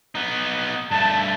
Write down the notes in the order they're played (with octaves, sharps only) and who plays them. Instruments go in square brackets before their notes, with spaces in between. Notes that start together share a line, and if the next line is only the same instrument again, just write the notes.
[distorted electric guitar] B3 D#4
[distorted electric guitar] G2 A3 [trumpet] A5